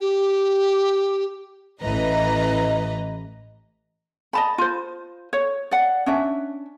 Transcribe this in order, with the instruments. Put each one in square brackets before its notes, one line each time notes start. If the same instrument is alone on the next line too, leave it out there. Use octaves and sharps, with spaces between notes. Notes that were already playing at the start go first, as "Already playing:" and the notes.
[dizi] G4
[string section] A1 E3 B4 D#5 A#5
[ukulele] D#5 A5 B5
F4 C5
C#5
D5 F#5
C#4 D4 E5